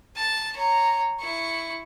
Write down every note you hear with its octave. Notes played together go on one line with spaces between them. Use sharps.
A5
C#5 A#5
E4 C#6